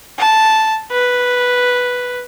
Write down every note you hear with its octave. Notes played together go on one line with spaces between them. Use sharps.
A5
B4